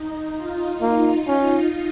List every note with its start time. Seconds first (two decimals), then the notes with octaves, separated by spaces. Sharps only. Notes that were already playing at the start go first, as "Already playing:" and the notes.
Already playing: D#4
0.36 F4
0.81 A#3 F4
1.27 C#4